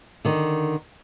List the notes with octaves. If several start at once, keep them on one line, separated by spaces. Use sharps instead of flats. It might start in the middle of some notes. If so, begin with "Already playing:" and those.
D3 D#3